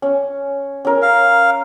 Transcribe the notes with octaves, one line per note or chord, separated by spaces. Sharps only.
C#4
C#4 A#4
F5